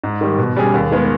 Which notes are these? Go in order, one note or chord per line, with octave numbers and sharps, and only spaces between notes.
G#2
D#3 G3
B2
G3 C#4 G#4
D#2
D#3 G#3 B3